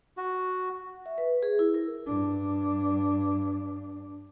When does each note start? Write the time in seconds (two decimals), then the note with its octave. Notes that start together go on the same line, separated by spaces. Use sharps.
0.17 F#4
1.06 E5
1.18 B4
1.43 G#4
1.59 E4
1.74 A#4
2.07 G2 D4